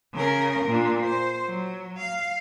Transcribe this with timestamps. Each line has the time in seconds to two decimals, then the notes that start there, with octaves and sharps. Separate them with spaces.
0.14 C#3 A#4
0.66 A#2 D4
1.03 C5
1.47 F#3
1.98 F5